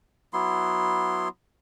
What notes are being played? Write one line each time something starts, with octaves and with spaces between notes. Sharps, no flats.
F#3 B3 E4 C6